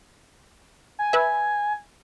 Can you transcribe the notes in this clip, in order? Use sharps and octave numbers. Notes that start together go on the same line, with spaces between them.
G#5
B4 E5